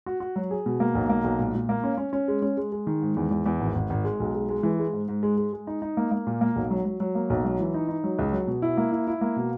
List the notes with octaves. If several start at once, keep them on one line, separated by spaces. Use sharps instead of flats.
F#4
F#4
F#3
G#4
B2
A#3
B1
A#3
B1
A#2
A#2
A#3
C#4
C#4
C#4
G#3
C#4
G#3
G#3
D#3
G#2
E2
E2
E2
G#1
G#1
G#1
G#3
B1
G#3
G#3
E3
G#3
G#2
G#2
G#3
G#3
G#3
D#4
D#4
A#3
A#3
A#2
A#3
B1
F#3
F#3
F#3
A#3
B1
F#3
E3
D#4
D#4
F#3
C#2
F#3
B2
E4
A#3
E4
E4
A#3
B2